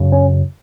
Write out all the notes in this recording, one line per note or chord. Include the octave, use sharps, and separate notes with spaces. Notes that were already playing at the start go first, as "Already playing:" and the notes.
Already playing: F#2 C#3
C#4